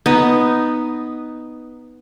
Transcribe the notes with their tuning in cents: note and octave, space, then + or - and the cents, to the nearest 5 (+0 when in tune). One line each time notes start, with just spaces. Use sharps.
B3 +0 D#4 +0